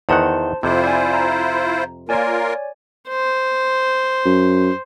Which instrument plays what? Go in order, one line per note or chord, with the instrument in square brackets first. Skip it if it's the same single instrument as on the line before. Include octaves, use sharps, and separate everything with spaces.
[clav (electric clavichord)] E2 D#3 F#5 [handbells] C5 A5 C6
[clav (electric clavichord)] F2 C3 [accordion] E4 F4 C5
[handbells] D5 G#5
A#5
[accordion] A#3 F4 A#4 [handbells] C#5 D5 G#5
[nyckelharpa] C5
[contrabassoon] F#2